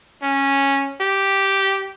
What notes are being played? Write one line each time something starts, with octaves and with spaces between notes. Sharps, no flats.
C#4
G4